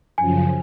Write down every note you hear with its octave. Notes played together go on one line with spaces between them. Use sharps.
F#2 C#3 F3 G#5